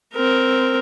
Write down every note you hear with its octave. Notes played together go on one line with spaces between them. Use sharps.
C4 A#4